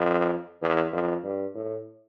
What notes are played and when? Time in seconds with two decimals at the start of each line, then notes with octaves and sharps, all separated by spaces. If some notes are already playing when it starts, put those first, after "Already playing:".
Already playing: F2
0.62 E2
0.93 F2
1.24 G2
1.55 A2